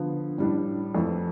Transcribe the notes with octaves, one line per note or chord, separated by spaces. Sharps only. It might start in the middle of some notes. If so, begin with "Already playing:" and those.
Already playing: D3 F3 B3
A2 G3 D4
F2 E3 A3